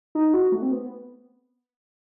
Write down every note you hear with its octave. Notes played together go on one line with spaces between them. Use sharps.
D#4
F#4
A3
C4
B3